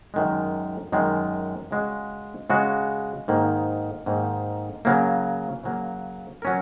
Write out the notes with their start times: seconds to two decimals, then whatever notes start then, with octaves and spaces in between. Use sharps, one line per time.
0.14 F#2 D#3 G#3
0.92 F#2 D#3 G#3
1.71 C#3 G#3 F#4
2.50 C#3 G#3 F#4
3.28 G#2 D#3 A#3
4.06 G#2 D#3 A#3
4.85 C#3 F#3 A#3
5.64 C#3 F#3 A#3
6.42 F#3 C#4 A#4